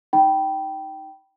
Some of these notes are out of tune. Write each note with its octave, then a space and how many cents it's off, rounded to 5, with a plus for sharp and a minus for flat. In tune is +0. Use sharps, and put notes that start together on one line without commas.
D#4 +0 G5 -15 B5 -20